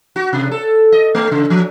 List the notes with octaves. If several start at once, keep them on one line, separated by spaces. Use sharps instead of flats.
F#4
C3
A4
D#5
A3
C#3
F3